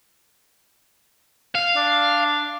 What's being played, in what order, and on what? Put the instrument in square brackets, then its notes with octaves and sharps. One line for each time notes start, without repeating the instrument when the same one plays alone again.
[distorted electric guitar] F5
[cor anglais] D4